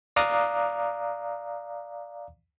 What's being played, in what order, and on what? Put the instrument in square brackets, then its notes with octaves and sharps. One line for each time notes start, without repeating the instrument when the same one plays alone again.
[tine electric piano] D5 F5 A#5 D6 D#6 F#6